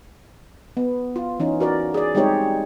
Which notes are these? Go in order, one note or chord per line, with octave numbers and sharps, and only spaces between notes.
B3
F4
E3 C#4 D#4
F#4 A#4 D5
G#4 D5
G3 G#3 C4 D#4 G4 C#5